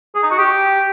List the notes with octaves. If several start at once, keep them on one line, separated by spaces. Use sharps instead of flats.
G#4
D#4
F#4
G4